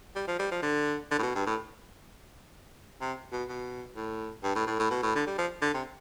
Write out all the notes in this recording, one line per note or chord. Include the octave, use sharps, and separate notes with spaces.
G3
F3
G3
F3
D3
D3
A2
B2
G2
A2
C3
B2
B2
A2
G2
A2
A2
A2
B2
A2
D3
G3
F3
D3
C3